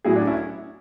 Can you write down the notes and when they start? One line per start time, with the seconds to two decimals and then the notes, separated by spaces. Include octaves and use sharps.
0.05 A2 F#3 E4 G#4
0.16 D4 F#4
0.27 C#4 E4